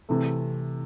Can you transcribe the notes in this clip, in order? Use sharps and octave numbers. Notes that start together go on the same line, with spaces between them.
C3 E3 A3